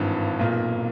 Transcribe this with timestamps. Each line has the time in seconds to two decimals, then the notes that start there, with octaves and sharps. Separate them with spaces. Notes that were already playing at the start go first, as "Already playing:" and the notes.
Already playing: G#1 G2 E3
0.39 B1 A#2 A#3